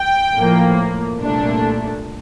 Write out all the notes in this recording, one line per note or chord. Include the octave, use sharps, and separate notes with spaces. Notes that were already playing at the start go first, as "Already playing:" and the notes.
Already playing: G5
A2 F3 A#3
C2 A#2 A3 D4